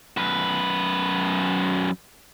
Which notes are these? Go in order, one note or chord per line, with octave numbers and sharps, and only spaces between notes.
F#2 B4